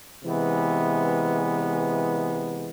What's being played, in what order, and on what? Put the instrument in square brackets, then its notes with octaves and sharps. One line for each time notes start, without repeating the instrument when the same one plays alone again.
[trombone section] C3 E3 G#3 B3